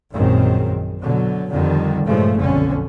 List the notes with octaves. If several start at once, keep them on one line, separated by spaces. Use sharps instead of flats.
A#1 F#2 D#3 G#3 C4
B2 D3 F#3
F2 D3 D#3 G3
G2 A#2 C#3 F3 G#3 A3
F#1 B1 F2 D3 C#4